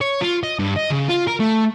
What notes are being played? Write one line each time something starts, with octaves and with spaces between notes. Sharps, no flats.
C#5
F4
D#5
G2
D#5
C#3
F4
A#4
A3